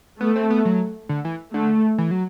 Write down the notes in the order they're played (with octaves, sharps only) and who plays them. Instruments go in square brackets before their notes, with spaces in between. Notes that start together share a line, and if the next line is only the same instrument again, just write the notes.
[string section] A3 [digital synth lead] B3
[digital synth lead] C4
B3
F#3
D3
E3
[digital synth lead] D3 [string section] A3
[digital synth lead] E3
F#3